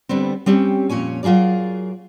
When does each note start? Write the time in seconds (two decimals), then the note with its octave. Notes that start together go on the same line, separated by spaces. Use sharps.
0.09 D3 G3 B3 C4
0.46 G3 C4 C#4 G4
0.89 F2 A#2 C#4 C#5 G#5
1.23 F#3 F4 G#4 A#4 D5